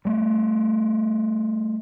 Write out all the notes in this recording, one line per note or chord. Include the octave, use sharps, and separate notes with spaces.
G3 A3